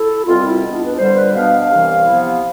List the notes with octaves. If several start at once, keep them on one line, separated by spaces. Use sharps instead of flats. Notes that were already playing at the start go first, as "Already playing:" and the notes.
Already playing: E4 A4
C2 B2 G3 C4 F4
E4
E2 B2 B3 D4
F4
B4
F2 D3 G3 C5
B4
B2 B3 D4 F5
C2 C3 E3 G3
C3 F3 B3 E4